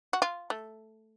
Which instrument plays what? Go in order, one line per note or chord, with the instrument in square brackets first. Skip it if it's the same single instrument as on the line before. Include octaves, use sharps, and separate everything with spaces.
[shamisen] F#4
F4
A3